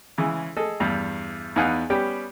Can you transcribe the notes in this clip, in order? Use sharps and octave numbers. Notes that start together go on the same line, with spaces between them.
C#3 E3 G#3
G#4 A4 D#5
E2 G2
E2 B3 D#4 F5 F#5 G#5
G3 B3 C#4 G4 G5